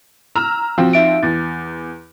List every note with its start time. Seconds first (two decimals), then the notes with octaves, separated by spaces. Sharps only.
0.35 A#5 E6 F6
0.78 F3 C4 F#4
0.93 D#4 E5 D7
1.23 E2 A6